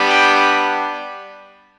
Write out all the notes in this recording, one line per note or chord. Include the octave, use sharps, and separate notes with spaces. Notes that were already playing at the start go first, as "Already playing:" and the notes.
Already playing: G3 B3 D4 G4
G5